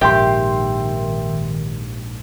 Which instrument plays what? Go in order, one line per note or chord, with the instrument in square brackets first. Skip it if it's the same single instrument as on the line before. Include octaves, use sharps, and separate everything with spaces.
[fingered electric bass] A#1 G#2 [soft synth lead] D#3 [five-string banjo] G4 [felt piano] E5 G5 C6